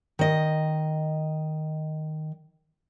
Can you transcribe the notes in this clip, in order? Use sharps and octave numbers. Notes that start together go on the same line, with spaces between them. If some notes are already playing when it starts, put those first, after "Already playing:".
D#3 D#5